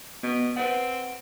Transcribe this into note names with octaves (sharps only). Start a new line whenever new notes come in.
B2 B3
C4 B4 C5 F#5